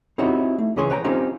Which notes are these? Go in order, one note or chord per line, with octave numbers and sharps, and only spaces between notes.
C4 D#4 E4 F#4 G4 C#5
A3
C#2 E3 C#4 G#4 C#5 C6
B4 C#5 G5 G#5 A#5
C4 C#4 D#4 F4 G4 C5